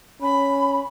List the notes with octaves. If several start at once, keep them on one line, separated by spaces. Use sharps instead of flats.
C#4 B5